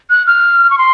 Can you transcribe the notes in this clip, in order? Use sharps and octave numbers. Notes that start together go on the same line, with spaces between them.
F#6
F6
C#6
C6